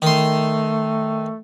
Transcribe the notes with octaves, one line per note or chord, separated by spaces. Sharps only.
D#3 A3 C6